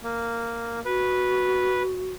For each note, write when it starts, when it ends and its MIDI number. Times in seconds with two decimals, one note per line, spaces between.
0.03 0.80 58
0.85 2.14 66
0.85 1.83 71